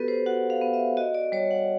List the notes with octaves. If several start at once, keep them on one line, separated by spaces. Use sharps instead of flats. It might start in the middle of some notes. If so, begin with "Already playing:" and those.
Already playing: B3 F#4 G4 A4 B4
C5
F#4 F#5
F5
B3
E5
F#4 D#5
D5
G3 C#5
F#5